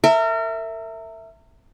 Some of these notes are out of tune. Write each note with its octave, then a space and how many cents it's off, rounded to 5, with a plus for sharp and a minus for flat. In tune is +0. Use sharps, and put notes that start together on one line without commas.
A#4 -35 E5 +0